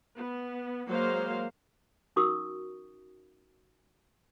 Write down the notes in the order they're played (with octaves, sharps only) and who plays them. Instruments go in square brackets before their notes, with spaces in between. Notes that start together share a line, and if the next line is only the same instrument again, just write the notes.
[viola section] B3
F#3 G#3 A#3 C5 F5
[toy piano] C#4 D#4 F#4 A#4 C#6 D#6